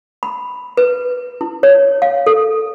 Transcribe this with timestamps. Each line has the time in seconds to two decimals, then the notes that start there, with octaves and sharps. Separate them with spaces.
0.23 B5
0.77 B4
1.41 E4
1.63 C#5
2.02 F5
2.26 A4